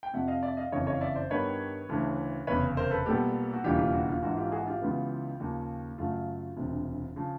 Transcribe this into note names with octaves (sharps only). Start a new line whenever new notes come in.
G5
F2 C3 F3 E5 F#5
D#5 F5
D5 E5
D#5 F5
F#1 F2 C#3 E3 C#5 D#5
C#5 D#5
F5
D5 E5
C5 D5
G2 D#3 G3 B3 B4 C#5
D2 C#3 E3 A3
F1 E2 C#3 B4 C#5
A#4 C5
A4 B4
B1 A#2 G3 B3 G4 A4
F#4
E1 D#2 C#3 E3 G3 F4 G4
F4 G4
F#4
F4
A#1 G#2 E3 F#4
F4 G4
F#4 G#4
F4 G4
C#2 C#3 E3 G#3 B3
D#2 C#3 F3
F#2 C#3 F#3 A3 F4
E1 D2 C3
C#3 F3